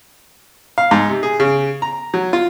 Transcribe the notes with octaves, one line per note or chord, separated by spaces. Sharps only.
F5
G#2
C3
G#4
C#3
A#5
F#3
F4